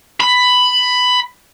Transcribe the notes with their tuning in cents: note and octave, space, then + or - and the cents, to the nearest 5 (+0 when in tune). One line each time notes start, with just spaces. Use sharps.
B5 +10